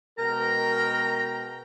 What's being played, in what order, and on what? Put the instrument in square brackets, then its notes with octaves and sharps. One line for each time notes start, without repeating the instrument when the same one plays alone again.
[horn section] B2 G#3 G5 [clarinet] A#4 [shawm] A#5